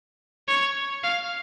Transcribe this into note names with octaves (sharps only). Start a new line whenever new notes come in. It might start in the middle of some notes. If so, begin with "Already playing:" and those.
C#5
F5